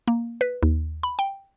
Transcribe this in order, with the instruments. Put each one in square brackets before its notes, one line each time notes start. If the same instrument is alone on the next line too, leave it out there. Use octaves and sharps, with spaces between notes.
[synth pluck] A#3
B4
D#2
B5
G5